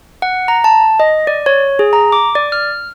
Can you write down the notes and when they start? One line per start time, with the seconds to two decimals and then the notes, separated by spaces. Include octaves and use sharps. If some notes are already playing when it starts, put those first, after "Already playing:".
0.22 F#5
0.48 A#5
0.64 A5
1.00 D#5
1.27 D5
1.46 C#5
1.79 G#4
1.93 A#5
2.12 D6
2.35 D5
2.52 F6